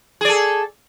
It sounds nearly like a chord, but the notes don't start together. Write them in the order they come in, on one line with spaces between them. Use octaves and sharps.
G#4 D5 A4